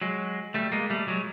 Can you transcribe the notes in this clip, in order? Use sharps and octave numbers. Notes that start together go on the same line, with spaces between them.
F#3 G#3
G3 A3
G#3 A#3
G3 A3
F#3 G#3